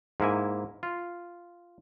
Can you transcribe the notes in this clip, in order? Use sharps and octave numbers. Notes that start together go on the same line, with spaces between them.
G#2 A#3 E4 G#5
F4